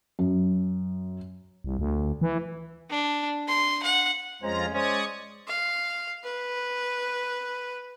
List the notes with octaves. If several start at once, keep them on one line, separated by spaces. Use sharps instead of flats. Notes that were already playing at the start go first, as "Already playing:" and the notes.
F#2
C2
D2
E3
D4
C6
F#5
F2 G#3 C#4 F4 C5 A#5
G#3 C#4 C5 D5 C#6 D#6
F5
B4